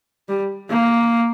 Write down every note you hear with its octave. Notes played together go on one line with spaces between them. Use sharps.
G3
A#3